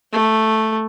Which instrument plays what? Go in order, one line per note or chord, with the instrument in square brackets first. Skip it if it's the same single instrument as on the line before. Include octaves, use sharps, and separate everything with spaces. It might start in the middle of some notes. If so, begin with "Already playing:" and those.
[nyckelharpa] A3